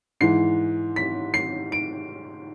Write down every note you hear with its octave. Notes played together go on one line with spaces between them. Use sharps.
G#2 E3 C7
B6
C7
D7